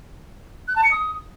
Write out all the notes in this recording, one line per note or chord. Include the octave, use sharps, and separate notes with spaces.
F#6
A5
C#7
D#6